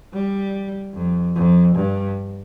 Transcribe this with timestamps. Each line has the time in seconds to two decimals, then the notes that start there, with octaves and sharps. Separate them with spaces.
0.13 G3
0.94 F2
1.36 F2
1.75 G2